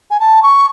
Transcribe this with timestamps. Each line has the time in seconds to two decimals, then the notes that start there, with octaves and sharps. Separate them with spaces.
0.11 G#5
0.20 A5
0.43 C#6